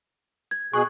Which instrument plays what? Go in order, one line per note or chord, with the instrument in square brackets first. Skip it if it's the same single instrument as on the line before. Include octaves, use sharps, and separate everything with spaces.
[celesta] G#6
[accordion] B2 G#4 F#6 [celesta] C#6